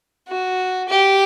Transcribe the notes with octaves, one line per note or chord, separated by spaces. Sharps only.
F#4
G4